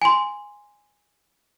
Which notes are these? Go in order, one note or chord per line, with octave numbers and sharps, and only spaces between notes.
G#5 C6